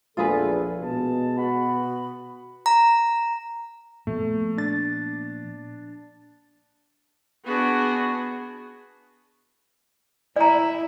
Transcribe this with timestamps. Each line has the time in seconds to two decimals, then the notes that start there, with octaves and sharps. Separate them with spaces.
0.17 A#1 E2 F4 G#4 A4 B4
0.82 B2 G#3 A5
1.37 B3 F#4 B5
2.66 A#5
4.07 A#2 F3 A3 B3
4.58 D4 A6
7.45 B3 D4 F#4 G#4
10.36 E4 D5 A#5